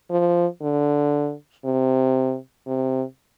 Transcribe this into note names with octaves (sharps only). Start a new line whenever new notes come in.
F3
D3
C3
C3